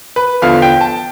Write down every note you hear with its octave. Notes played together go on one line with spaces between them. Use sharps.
B4
E2 D3 F3 F5
G5
A5